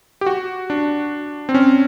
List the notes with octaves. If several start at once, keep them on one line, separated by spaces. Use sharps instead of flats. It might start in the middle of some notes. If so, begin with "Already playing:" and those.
G4
F#4
D4
C4
C#4